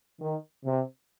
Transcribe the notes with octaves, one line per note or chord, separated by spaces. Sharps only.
D#3
C3